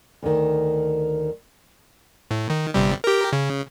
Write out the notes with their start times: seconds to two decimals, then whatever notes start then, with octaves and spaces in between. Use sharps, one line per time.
0.23 D2 D#3
2.31 A2
2.50 D#3
2.74 G1 C3 G3
3.04 G4 A#4
3.33 C#3